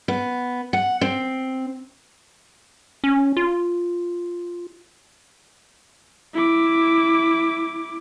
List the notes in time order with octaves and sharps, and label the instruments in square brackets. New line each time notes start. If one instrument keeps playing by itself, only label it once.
[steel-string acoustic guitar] B3
F#5
C4
[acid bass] C#4
F4
[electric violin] E4 D6